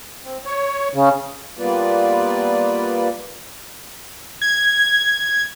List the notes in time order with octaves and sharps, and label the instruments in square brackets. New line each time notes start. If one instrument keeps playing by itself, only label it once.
[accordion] C4
C#5
C#3
[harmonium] G3 A#3 B3 F4 B4 D5
[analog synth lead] G#6